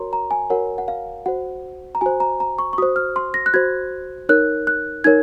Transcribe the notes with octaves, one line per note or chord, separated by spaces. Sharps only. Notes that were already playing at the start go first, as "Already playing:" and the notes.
Already playing: F#4 A#4 C#5 A#5 C6
A#5
G#5
F#4 A#4 C#5 F#5
F#5
F5
F#4 C5 F#5
A#5
F#4 C5 G#5
A#5
A#5
C#6
C#6
F#4 C5 D#6
F6
C6
A#6
F#6
F#4 C5 G#6
D#4 A#4 C#5 F#6
F#6
D#4 A#4 C#5 G#6